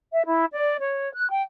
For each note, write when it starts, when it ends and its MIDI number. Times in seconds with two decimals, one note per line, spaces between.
0.12 0.24 76
0.26 0.45 64
0.53 0.78 74
0.79 1.09 73
1.14 1.29 90
1.30 1.43 79